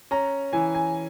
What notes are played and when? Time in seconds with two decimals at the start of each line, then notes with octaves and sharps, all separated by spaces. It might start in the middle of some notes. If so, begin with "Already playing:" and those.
0.11 C#4 A#5
0.53 E3 G#5
0.75 G#5